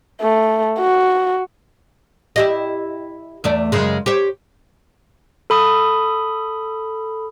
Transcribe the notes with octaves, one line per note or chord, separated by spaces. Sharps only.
A3
F#4
E4 G4 D#5
E2 A3 D5
F#2 C#3 G#3
G4 C5 C#5
A4 B5 D#6